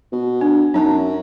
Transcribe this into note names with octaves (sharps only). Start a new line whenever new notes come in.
B2
D4
F#2 D#4 A5 A#5